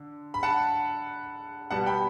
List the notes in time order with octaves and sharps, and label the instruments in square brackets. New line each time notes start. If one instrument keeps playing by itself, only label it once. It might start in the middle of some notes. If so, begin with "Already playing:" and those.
Already playing: [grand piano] D3
B5
F#5 A5
B2 G3 B3 F#5 A5
G5 B5